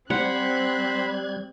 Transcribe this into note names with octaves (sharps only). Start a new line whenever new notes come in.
G3 C4 C5 F#5 B5 F#6 G#6